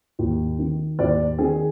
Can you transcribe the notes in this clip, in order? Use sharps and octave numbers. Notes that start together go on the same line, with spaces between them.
D#2
D#3
D#2 D5
D#3 G#4